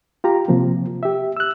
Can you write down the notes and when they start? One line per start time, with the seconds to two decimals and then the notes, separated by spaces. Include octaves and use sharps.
0.24 F4 G4 A#5
0.48 C3 F3 A#3
1.03 G4 E5
1.37 E6 F#6